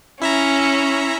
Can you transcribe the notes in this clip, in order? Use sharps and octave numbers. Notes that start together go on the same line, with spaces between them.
C#4 E4 E5 A#5